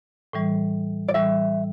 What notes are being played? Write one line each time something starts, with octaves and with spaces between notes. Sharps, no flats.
A2 E3 G3
D5
A2 E3 G3 E5